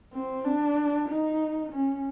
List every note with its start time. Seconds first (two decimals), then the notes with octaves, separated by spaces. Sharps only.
0.14 C4
0.45 D4
1.09 D#4
1.72 C#4